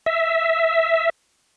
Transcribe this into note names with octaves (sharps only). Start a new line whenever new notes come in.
E5